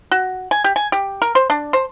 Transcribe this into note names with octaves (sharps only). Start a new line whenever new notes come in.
F#4
G#5
G4
G#5
G4
A#4
C5
D4
C5